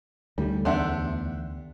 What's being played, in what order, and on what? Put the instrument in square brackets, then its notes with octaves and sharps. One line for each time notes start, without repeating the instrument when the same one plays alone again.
[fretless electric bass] D2 D#3 A3 [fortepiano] G3
[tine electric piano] E2 [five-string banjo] D4 G4 [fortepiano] E5 F#5 C6